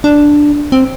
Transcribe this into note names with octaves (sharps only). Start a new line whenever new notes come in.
D4
C4